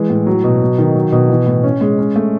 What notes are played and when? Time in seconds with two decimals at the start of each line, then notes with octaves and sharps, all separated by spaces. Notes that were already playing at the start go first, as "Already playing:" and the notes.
Already playing: E3 G#3
0.10 A2
0.26 F#3
0.44 B2
0.62 F#3
0.78 D#3
0.95 F#3
1.12 B2
1.29 E3
1.46 A2
1.64 C#4
1.81 G#3
1.99 C#4
2.16 A3